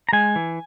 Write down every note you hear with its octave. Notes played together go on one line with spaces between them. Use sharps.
A#5
G#3 G#5
E3